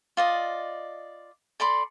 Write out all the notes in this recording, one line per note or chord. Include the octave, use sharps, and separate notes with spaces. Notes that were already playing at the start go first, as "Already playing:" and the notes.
F4 D5 D#5
A4 D5 B5 C6